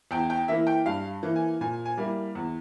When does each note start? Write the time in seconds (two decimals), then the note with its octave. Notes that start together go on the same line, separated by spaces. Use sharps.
0.11 E2 G5
0.30 G5
0.48 E3 A#3 E4 E5
0.67 G5
0.86 G2 F5
1.23 E3 A#3
1.36 G#5
1.61 A#2 G#5
1.85 G#5
1.97 G3 A#3 E4
2.35 E2